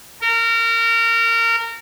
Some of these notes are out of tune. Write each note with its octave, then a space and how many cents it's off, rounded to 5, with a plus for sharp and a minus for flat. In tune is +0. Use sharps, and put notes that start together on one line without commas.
A#4 -25